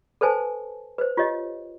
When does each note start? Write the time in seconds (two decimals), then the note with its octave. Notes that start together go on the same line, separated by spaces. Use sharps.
0.21 A4 B4 C5 G#5 A5
0.98 B4 C5
1.17 F4 G4 C#5 D#5